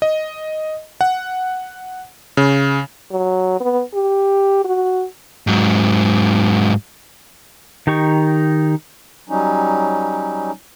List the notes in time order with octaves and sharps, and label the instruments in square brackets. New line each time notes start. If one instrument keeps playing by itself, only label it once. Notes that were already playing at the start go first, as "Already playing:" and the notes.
[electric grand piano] D#5
F#5
C#3
[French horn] F#3
B3
G4
F#4
[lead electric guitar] G#2 F#3
[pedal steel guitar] D#3 D#4 G4 C#6
[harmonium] F#3 G3 C#4 D#4